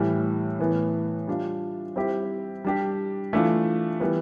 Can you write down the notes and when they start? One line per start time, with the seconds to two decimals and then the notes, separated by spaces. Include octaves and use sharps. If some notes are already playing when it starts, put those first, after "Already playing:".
Already playing: A2 E3 G3
0.59 A2 E3 B3
1.27 G3 D4 F4
1.96 G3 C4 E4 G4
2.64 G3 D4 G4
3.33 E3 A3 D4 F4
4.00 E3 G3 B3